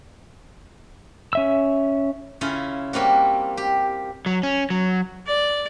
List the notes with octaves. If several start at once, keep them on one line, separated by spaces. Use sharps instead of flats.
C#4 E5 E6
C#3 C#4 E4 F4
G3 A#3 C4 F#4
G4
F#3
C#4
F#3
D5